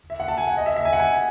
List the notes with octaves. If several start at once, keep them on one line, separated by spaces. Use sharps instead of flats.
E5
F#5
A5
G#5
F#5
D#5
E5
E5
G#5
F#5
G#5